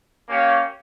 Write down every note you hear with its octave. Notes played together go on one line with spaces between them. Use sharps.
A#3 C#4 G4 C#5 F5